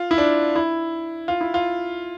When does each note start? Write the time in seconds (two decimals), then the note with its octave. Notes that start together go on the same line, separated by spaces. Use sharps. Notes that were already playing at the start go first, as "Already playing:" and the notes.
Already playing: F4
0.11 E4
0.18 D4
0.56 E4
1.28 F4
1.41 E4
1.54 F4